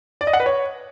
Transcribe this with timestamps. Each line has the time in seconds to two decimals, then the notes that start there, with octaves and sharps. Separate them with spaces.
0.21 D5
0.27 D#5
0.33 F#5
0.40 B4
0.46 C#5